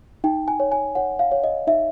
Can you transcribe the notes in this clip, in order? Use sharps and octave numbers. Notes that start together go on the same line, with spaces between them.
D#4 G5
G#5
C#5
G#5
C#5 F#5
F5
C#5
D#5
D#4 E5